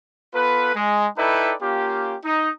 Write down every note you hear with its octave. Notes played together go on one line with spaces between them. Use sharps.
B3 F4 A4 B4
G#3
D#4 E4 A4 B4 D5 G5
A#3 C#4 F4 G4
D#4